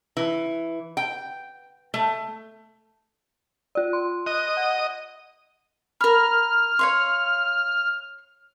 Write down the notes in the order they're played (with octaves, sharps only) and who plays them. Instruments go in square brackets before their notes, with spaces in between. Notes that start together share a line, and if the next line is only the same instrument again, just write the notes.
[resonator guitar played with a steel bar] E3
G5
A3
[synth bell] F4 D5
C6
[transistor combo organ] D#5 [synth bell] F#6
[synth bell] F#5
[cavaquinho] A#4 B5 [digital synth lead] F6
[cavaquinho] C#5 F5 C6